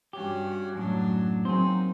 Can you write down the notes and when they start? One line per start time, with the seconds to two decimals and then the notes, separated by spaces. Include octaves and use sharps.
0.13 G2 C#4 F#4 G4
0.75 F#2 A2 F#3 D4
1.45 F#3 A#3 C4 D#4 G#4 C5